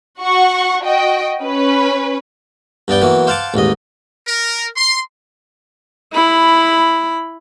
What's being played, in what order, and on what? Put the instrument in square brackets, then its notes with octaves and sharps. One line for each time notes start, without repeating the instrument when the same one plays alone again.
[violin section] F#4 F#5 C#6
F#4 D#5 G5
C#4 B4
[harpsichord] G2 B3 D5 G5
E3 F#3 A#3 B3
C5 F5 F#5 A5 D6
A1 D#2 G#2 D#5
[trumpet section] A#4
C6
[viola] E4 B5